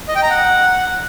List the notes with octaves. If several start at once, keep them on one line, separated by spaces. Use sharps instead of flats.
D#5
G5
A#5
F#5